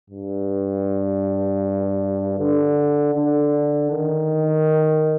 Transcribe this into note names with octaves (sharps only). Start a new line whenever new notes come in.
G2
D3
D3
D#3